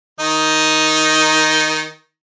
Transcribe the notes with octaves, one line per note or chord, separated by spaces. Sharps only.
D#3 D#4